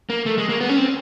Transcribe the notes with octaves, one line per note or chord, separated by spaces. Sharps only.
A#3
A3
G#3
A#3
B3
C#4
C4